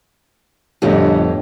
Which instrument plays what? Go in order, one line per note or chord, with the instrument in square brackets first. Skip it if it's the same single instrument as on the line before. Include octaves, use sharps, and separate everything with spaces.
[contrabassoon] G1 [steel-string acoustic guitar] F2 A2 [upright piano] G4 C#5 D#5